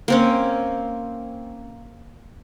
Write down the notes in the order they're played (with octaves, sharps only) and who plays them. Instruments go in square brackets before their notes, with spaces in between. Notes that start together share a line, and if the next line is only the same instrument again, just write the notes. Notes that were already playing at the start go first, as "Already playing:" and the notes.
[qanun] A#3 C4 C#4